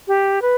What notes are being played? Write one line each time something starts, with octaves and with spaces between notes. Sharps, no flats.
G4
B4